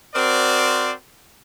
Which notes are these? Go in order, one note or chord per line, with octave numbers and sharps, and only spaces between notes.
C4 F#4 A#4 C5 D5